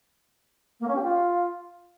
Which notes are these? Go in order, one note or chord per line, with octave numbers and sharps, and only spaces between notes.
A#3
C#4
G4
F4